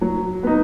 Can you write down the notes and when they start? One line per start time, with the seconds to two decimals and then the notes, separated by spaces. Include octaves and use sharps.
0.01 F#3
0.43 B3 D#4